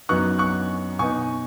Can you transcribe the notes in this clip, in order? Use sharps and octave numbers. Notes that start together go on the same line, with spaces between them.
F#2 F#3 B3 D#4 C#6 F#6
C#6 F#6
B2 B3 D#4 G#5 C#6